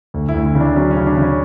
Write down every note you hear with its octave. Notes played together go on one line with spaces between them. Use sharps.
D2
E4
D2
E4
C#3
D4
F#3 C#4
C#4
C#3
D4
C#3
C#4